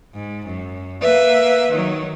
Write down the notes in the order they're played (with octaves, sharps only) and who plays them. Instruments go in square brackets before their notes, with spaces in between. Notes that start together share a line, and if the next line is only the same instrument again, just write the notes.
[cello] G#2
F#2
[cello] A#3 E5 [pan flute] B4
[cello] D#3 F#3